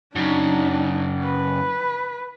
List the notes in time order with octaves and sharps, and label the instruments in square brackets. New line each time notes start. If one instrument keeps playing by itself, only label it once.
[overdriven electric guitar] F#2 C#3 [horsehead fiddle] D4 D#4
[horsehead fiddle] B4